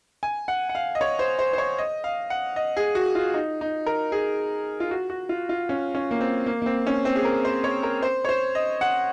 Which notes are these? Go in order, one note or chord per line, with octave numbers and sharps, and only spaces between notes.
G#5
F#5
F#5
F5
D#5
C#5
C5
C5
C5
C#5
D#5
F5
F#5
D#5
G#4
F#4
F4
D#4
D#4
A#4
G#4
F4
F#4
F#4
F4
F4
C#4
C#4
A#3
C4
A#3
A#3
C4
C#4
C4
G#4
A#4
C5
C#5
A#4
C5
C#5
C5
D#5
F#5